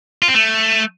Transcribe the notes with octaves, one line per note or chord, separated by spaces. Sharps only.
F4
C4
A3